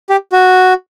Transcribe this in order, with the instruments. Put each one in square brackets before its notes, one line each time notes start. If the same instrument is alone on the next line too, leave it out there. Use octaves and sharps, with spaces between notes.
[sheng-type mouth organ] G4
F#4